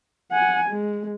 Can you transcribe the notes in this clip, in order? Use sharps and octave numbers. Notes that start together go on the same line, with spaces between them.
F#5 G#5
G#3